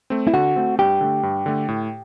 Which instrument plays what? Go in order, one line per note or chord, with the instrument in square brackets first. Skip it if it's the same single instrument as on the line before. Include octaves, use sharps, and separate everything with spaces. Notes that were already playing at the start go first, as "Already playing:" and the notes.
[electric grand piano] A3 C4
[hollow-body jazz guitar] E4
[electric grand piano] D3 [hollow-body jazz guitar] F#4
[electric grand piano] A3 C4
[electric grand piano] G2 [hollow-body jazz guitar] G4
[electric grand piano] D3 A3
G2
D3 A3
A2